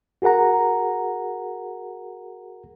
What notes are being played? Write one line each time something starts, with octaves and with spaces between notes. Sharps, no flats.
F#4 G#4 A#4 F#5 A#5